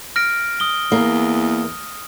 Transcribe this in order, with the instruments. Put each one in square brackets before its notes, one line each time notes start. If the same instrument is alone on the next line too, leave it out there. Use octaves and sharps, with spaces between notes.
[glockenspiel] F6 A#6 D7
D#6 G7
[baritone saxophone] E2 [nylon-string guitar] A#3